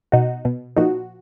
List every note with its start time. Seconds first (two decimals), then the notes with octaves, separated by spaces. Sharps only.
0.12 B2 D#4 F#4
0.45 B2
0.77 A#2 F3 D#4 F#4